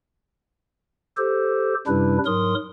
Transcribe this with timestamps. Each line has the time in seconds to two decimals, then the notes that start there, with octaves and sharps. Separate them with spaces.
1.17 G4 A4 C5
1.87 F#2 C3 G3 D4 E4 B4
2.26 G#2 F#3 A#4 C6 D#6